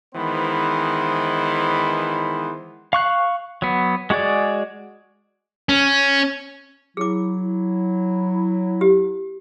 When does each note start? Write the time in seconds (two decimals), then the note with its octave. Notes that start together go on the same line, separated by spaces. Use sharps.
0.15 D#3 E3 G#3 B3 C5
2.93 F5 C#6 F#6
3.62 F#3 B3
4.10 G#3 F#4 G#4 D5
5.69 C#4
6.97 F#3 E4 G#4 D6
8.81 G4